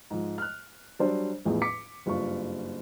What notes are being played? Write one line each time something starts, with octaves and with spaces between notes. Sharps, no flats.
G#2 F3
F6 F#6
F#3 G3 D4 C5 D5
A1 E2 A2 F3 G#4
D6 B6 C#7
F#1 G2 F4 C#6